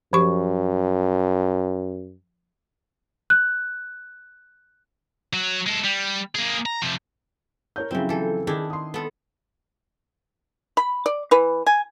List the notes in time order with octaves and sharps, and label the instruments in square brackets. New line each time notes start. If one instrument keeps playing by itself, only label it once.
[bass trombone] F#2 [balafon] F3 G4 C#6
[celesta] F#6
[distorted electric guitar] F#3 F#4
G#3 A4
G3
A#3 G#4
A#5
C3 F3
[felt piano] A#4 C#5 G6
[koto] C#3 C4 [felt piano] F3 F#3 E4
[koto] E3 A4
[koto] D#3 D4 E4 [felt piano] G#4
[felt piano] C6 D#6
[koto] B3 A4
[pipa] B5
D5
E3 B4
G#5